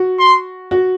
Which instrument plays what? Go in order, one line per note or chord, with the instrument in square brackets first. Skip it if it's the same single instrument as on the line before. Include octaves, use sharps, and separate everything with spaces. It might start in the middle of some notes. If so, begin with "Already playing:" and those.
Already playing: [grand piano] F#4
[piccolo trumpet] C6
[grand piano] F#4